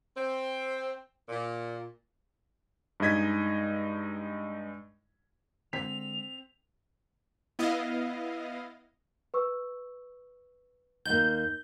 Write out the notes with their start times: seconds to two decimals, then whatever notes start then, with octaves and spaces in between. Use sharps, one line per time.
0.16 C4
1.28 A#2
3.00 G2 G#3 D#4 D#5 G#6 B6
5.73 D3 G#3 C4 B6 F7
7.59 B3 E4 D#5 F5
9.34 B4 C#6 E6
11.05 D#2 A#3 G6